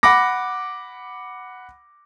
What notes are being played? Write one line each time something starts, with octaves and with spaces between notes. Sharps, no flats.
F#5 B5 D6 A#6